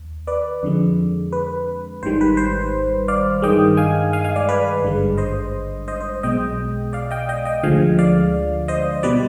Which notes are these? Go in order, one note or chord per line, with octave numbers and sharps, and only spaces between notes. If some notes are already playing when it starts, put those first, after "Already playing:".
Already playing: D#2
B4 D5
F2 D3 G#3
B4
G#1 G#2 D#3 G3 C5
B4
C5
D5 F5
G2 D#3 G#3 D#5 G5
F5 G#5
F5 G#5
F5 G#5
D5 F5
B4 D5
G#1 G2 D3 G#3
C5 D#5
C5 D#5
C5
B1 B2 G#3 D#5 G5
D5 F5
D#5 G5
D#5 G5
D#5 G5
D2 D3 F3 G#3 F5 G#5
D5 F5
C5 D#5
B2 G3 B4 D5